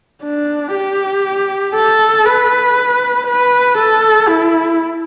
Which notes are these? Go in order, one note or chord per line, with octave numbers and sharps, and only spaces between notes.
D4
G4
A4
B4
B4
A4
E4